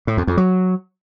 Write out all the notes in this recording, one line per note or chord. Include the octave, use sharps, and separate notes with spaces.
A2
F2
F2
F#3